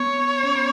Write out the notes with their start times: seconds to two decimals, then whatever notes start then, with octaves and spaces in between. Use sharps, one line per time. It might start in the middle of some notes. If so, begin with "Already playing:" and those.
Already playing: B3 C#5
0.43 C#4
0.55 B3